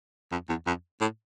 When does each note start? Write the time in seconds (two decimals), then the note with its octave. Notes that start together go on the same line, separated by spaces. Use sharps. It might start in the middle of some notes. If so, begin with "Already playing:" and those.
0.32 F2
0.49 E2
0.67 F2
1.01 A2